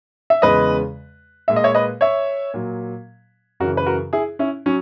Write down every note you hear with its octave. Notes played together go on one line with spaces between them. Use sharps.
E5
E2 C#3 G#3 B4 D#5
A#2 G#3 E5
D#5
C#5 E5
B4 D#5
C#5 E5
A#2 F#3
F#2 C#3 E3 F#4 A#4
B4
F#4 A#4
E4 G#4
C#4 E4
F#3 C#4